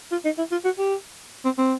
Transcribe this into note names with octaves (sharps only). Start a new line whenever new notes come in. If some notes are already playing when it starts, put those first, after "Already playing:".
F4
D#4
E4
F4
F#4
G4
C4
C4